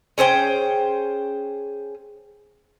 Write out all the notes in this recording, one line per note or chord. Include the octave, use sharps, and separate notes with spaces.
C#4 G#4 C5 G5